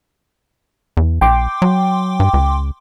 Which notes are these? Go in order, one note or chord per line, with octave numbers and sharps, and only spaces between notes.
E2
A#1 G5 C6 D6
F#3
G2
C#2